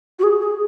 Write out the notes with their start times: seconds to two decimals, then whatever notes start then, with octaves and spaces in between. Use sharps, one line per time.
0.19 F#4
0.23 G#4
0.41 G#4